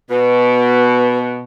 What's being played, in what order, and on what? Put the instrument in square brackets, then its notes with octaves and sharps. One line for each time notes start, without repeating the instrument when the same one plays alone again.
[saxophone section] B2 [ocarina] B4